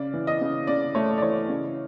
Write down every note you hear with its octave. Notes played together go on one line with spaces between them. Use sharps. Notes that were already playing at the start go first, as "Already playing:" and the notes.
Already playing: C#3 D5
E3
D#5
C#3
C#3 D5
A3 C#5
D5
E3 C#5
C#3